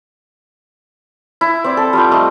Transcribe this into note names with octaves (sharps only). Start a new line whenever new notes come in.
E4
C4 D5
A4
G3 F4 G5
A3 D#5